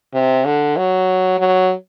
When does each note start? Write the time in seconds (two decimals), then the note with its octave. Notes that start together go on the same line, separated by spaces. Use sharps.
0.14 C3
0.45 D3
0.77 F#3
1.39 F#3